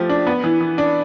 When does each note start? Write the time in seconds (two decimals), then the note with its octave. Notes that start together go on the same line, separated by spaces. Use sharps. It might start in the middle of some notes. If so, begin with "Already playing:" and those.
Already playing: F3 A3 G4
0.09 D4
0.27 B3
0.44 E3
0.61 E3
0.78 D4